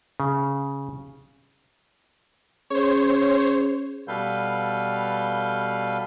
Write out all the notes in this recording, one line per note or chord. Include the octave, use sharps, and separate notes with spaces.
C#3
C#4 G#4 C5 C#5
B2 G3 A4 B4 F5 G6